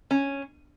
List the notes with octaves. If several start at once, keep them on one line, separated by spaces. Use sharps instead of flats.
C#4